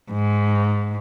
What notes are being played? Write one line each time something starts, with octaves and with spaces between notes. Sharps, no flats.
G#2